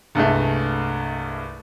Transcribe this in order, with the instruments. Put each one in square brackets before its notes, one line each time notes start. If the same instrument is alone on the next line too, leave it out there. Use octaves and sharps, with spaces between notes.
[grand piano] C2 G2 G#3 A3